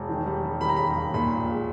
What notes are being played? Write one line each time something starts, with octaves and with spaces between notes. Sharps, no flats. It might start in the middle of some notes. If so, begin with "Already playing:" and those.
Already playing: E1
D#3
G3
G3
D#3 B5
A#5
D#2 B5
D#2
A#2 B5
A#1
G#3